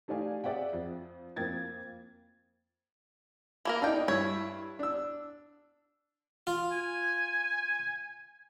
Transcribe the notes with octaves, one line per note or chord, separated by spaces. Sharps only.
A3 D#4 G4 D5 F5 G#5
G#4 D5 E5 F#5 G5
F2
F2 A#3 G5 G#6 A6
E3 A#3 A#4
D4 D#4 A4 G5
G2 E4 C#5
D4 E6
F4
G#5